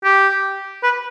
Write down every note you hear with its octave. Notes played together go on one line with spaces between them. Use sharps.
G4
B4